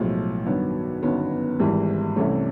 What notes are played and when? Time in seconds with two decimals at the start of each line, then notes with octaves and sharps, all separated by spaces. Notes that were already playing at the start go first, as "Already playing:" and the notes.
Already playing: B1 A2 F3 G#3
0.46 G2 D#3 F#3 B3
1.03 G1 F#2 D#3 F#3 B3
1.59 G#1 G#2 E3 G3
2.16 C2 C3 E3 A3 C#4